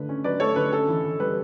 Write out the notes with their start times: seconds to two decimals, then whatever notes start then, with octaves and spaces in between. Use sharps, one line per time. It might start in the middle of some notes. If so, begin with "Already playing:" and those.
Already playing: D3 A3 B4
0.09 C#4
0.24 F#3 B4 D5
0.40 A3 A4 C#5
0.56 D3 B4
0.72 C#4 A4
0.88 E3
1.04 E3
1.20 G3 B4